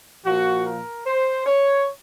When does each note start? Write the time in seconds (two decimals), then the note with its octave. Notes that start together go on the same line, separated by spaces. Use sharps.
0.24 A#2 F3 A#3 F#4
0.65 A#4
1.05 C5
1.46 C#5